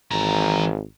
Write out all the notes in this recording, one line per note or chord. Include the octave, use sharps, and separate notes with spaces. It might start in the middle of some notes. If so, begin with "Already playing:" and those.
G#1 E3 A#5